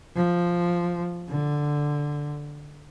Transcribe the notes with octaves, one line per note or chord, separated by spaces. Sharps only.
F3
D3